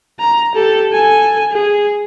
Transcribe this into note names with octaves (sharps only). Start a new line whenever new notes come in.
A#5
G4 A4
A4 G#5
G#4